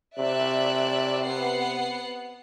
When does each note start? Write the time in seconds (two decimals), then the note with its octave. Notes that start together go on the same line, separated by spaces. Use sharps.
0.19 C3 D5 E5 F#6
1.23 B3 F#5 C7